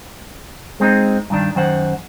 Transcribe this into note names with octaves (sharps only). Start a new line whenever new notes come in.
G#3 C4 C#4 D#4
G2 D#3 D4
F#2 D#3 C5 F#5